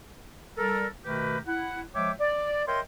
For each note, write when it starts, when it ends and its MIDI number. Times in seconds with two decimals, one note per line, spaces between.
0.57 0.87 55
0.57 0.87 69
0.57 0.87 70
1.05 1.38 47
1.05 1.38 51
1.05 1.38 57
1.05 1.38 67
1.05 1.38 70
1.05 1.38 71
1.47 1.81 64
1.47 1.81 78
1.95 2.11 53
1.95 2.11 56
1.95 2.11 73
1.95 2.11 76
1.95 2.11 79
1.95 2.11 86
2.20 2.62 74
2.67 2.80 70
2.67 2.80 73
2.67 2.80 75
2.67 2.80 76
2.67 2.80 79
2.67 2.80 84